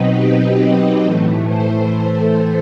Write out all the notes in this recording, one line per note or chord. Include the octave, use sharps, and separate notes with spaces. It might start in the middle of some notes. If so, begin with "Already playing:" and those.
Already playing: B2 F#3 C4 D#4 B4 D#5
G4 B4
A2 E3 A3
A4 C5